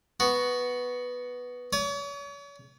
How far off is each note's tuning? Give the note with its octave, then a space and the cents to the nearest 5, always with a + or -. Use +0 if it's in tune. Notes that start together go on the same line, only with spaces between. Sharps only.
B3 +0 F#4 +5
C#5 +40 D#6 -20